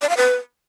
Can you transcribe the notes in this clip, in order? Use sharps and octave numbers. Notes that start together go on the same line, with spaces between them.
D5
F5
B4